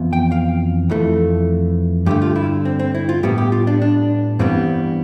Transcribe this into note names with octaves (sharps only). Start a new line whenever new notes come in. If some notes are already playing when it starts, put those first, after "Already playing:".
Already playing: F2 E3 B3
G5
F5
F2 E3 A3
G2 D3 A3 G4
F4
E4
C4
C4
E4
F4
A2 G3 B3 G4
G4
F4
D4
D4
G2 E3 G3 B3 C4